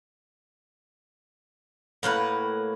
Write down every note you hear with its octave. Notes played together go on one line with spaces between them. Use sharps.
A2 A#3 B4 F#5